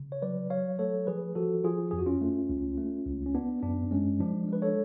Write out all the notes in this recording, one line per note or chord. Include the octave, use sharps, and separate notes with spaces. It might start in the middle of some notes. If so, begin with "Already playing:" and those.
Already playing: C#3
C#5
F#3 B4 D5
F#3 C#5 F5
A3 A4 C#5
F3 G#4 B4
F3 F#4 A4
F3 F4 G#4
F2 G#4
F#4
C#4 F4
A3
C#2
A3
C#2
C#4
B3 D4
F#2 D4
G#3 C#4
F3 D4
G#3 B4
A4 C#5